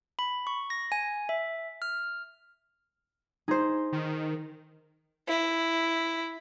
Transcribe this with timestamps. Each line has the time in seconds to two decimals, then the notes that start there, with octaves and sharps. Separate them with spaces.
0.19 B5
0.47 C#6
0.70 A#6
0.92 G#5
1.29 E5
1.82 F6
3.48 D#4 G#4 C5 G6
3.93 D#3
5.28 E4